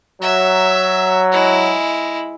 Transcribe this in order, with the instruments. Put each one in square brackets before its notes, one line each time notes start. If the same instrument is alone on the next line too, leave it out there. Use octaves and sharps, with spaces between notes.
[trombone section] F#3 [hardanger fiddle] E5
[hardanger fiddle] G#3 E4